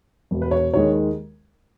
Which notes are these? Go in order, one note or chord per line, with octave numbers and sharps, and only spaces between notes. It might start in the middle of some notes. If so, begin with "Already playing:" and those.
E1
B4
C#5
D#2 D#3 G#3 C#5